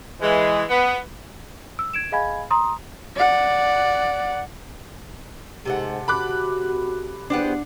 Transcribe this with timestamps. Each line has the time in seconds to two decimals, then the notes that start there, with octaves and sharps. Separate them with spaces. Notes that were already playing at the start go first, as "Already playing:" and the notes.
0.21 E3 G#3
0.69 B3
1.79 E6
1.93 G#6 D7 E7
2.12 G#4 D#5 F5 G#5 B5 G#6
2.51 A#5 C6 D#6
3.16 D5 F#5
5.65 G#2 C3 A4 F#5
6.08 F#4 B5 D6 F#6
7.30 E2 B3 D4 G4 C5 F#5